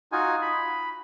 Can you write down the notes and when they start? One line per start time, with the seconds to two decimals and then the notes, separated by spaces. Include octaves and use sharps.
0.12 D#4 F4 F#4 G#5
0.42 B5